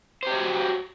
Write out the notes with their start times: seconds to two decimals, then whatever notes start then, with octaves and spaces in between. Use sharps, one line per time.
0.23 C5
0.27 G4
0.31 C#5
0.35 F#4